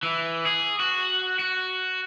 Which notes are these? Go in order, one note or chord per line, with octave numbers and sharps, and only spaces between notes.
E3
G#4
F#4
F#4